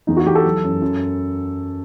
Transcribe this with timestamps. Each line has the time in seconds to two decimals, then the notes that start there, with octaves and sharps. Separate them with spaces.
0.07 E2 D#4
0.17 F#4
0.26 E2 G4
0.35 A4
0.45 F#3
0.64 F#2
0.82 F#2